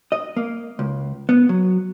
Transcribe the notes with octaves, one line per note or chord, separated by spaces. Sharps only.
D#5
A#3
C#2
B3
F#3